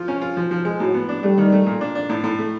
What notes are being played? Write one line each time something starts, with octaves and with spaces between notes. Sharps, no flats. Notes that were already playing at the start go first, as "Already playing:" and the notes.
Already playing: F3 F4
C#4
F4
F3
F3
G#3
A2 F#3
B3
D4
G3 A3
D#3
A3
A#2
D4
D4
A2
A2
A3